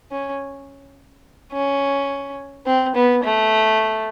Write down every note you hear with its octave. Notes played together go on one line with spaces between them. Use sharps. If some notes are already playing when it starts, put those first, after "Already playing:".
C#4
C#4
C4
B3
A3